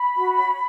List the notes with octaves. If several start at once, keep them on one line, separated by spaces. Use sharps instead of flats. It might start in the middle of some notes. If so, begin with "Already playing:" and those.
Already playing: B5
F#4
C#5